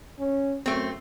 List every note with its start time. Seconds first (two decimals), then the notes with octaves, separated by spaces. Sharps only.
0.19 C#4
0.66 F#2 A3 C4